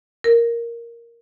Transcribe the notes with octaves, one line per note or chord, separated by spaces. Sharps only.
A#4